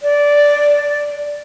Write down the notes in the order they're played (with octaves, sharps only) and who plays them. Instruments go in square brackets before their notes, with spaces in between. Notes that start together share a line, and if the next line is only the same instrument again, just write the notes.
[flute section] D5